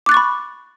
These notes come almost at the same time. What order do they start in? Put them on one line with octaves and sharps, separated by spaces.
D6 F#6 A6 C#6 B5